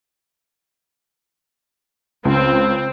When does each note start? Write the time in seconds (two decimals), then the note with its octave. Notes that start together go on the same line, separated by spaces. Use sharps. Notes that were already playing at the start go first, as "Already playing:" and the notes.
2.25 C#2 C4